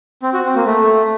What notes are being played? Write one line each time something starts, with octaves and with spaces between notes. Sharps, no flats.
C4
F#4
C4
A#3
A3